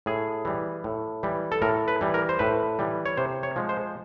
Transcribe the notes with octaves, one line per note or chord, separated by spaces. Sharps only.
A2 G#4
E3 G3
A2
E3 G3
A4
A2 A#4
B4
E3 G3
A#4
C5
A2 B4
E3 G3
C#5
C3 C5
C#5
F3 G#3
C5